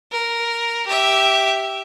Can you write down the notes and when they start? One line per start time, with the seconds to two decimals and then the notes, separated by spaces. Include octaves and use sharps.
0.12 A#4
0.87 G4 E5